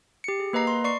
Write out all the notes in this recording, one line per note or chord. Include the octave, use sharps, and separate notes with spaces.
G4 C#7
G#4
A#3 B4 D#5 A#5 C7
C6
D5 C#6 C7